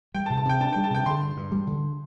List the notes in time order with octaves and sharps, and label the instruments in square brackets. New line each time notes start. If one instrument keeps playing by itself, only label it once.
[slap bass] G3 [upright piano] G5
[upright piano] A5
[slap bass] C3
[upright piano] A5
[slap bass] C3 [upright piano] G5
[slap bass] D4 [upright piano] A5
[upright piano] G5
[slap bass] G3
[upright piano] A5
[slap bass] C3 [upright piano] G5
[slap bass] D3 [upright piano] C6
[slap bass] G2
G2
G3
D3